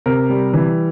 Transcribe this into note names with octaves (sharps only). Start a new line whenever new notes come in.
C3 A#4
G3
E3